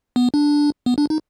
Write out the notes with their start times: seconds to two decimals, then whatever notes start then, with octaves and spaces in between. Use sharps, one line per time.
0.16 B3
0.34 D4
0.86 B3
0.98 D4
1.10 D#4